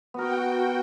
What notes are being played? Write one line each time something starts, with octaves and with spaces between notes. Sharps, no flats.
B3 F#4 A#4 G5